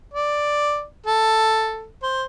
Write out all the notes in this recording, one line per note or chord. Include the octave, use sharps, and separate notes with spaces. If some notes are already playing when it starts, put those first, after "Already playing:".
D5
A4
C5